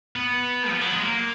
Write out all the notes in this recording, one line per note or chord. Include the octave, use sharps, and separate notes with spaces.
B3
F3
F#3
G#3
A#3